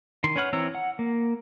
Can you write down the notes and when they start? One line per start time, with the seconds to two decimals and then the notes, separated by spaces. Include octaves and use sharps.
0.24 D#3 C6
0.36 C#4 B4 C#5 F#5 F6
0.53 E3 C4 C#5 A#5 E6
0.75 F#5
0.99 A#3